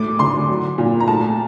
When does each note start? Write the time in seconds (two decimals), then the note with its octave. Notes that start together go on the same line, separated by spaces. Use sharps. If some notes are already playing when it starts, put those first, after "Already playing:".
Already playing: A2 A3 D6
0.19 D3 C6
0.49 F#3
0.78 A#2
1.00 A#5
1.07 A3 A5